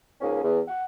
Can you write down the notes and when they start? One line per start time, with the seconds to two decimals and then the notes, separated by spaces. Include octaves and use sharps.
0.21 C#2 G#2 A#3 C#4
0.43 E2
0.68 F#5